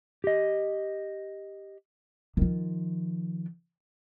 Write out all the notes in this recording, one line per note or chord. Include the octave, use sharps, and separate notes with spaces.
G4 D#5
D#3 F3